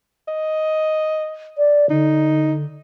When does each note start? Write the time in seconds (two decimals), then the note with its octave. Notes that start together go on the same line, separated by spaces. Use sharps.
0.28 D#5
1.58 D5
1.90 D3 D#4